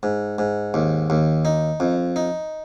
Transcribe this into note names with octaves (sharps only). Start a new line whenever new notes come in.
G#2
G#2
D#2
D#2
D#4
F2
D#4